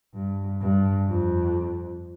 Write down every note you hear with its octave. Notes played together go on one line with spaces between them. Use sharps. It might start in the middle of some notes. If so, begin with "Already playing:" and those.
G2
G2
F2